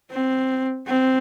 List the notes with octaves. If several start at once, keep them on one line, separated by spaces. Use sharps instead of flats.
C4
C4